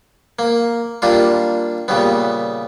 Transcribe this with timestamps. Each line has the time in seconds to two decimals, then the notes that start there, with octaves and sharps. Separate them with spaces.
0.39 A#3
1.02 G3 A#3 D4 F4
1.88 A#2 C#3 G3 B3